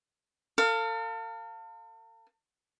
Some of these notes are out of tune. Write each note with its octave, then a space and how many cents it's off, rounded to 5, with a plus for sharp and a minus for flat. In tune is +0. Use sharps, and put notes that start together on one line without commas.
A4 +40 F5 +0